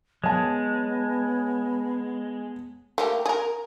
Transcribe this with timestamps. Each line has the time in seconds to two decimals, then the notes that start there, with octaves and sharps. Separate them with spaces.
0.24 F#3 G#3 B3 C#5 A5
2.98 A3 A#3 G4
3.26 G#4 A#4